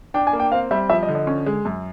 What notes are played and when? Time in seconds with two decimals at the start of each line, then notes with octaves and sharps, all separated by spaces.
0.14 D4 G5
0.27 G#5
0.33 A#3
0.40 G5
0.52 C4 F5
0.71 G3 E5
0.90 F3 E5
1.03 D#5
1.08 D3
1.15 D#5
1.27 C#4
1.46 G#3
1.65 F#2